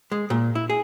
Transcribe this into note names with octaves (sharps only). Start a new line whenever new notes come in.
G#3
A#2
E4
G#4